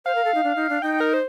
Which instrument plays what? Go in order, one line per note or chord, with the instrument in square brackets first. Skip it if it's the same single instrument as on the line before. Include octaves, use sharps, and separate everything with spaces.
[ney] C5 [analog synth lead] F5
[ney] A#4
A4
D#4
D4
D#4
D4
[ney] D#4 [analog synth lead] G5
[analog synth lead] A#4
C5